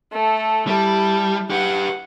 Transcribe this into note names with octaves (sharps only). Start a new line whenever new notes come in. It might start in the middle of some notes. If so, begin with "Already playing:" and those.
A3 A4
G3 E4 A5
G4 B4 F#5